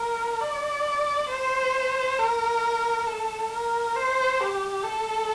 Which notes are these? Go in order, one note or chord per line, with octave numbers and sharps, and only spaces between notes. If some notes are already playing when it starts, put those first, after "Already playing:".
Already playing: A#4
D5
C5
A#4
A4
A#4
C5
G4
A4